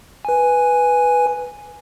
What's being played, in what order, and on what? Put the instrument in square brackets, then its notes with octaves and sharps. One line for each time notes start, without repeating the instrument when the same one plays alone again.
[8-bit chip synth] B4 G#5